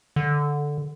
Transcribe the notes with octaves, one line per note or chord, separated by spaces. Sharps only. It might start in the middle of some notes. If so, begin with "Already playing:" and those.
D3